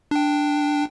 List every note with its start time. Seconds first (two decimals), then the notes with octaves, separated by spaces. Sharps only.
0.11 D4 G5